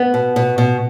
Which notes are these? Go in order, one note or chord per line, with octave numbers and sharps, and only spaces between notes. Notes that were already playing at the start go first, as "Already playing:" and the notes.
Already playing: B3
B2
B2
B2